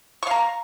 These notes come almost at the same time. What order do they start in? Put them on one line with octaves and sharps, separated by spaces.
C#6 F5 A#5